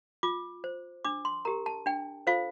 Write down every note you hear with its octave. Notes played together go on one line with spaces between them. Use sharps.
F4 D6
C5
D4 D6
C6
G4 A#4 A#5
A5
D4 G5
F4 A4 C5 F5